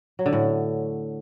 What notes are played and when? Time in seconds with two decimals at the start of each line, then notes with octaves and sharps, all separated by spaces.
0.19 F#3
0.26 D3
0.33 A2